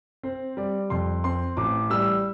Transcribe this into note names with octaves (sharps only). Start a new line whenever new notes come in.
C4 C5
G3 D5
F2 C6
C4 C6
A1 D6
G3 E6